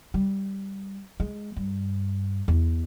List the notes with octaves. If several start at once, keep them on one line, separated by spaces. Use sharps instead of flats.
G3
G#3
G2
E2